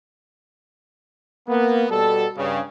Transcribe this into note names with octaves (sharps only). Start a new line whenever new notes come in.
A#3 B3
B2 G3 F#4 A4
G2 C#3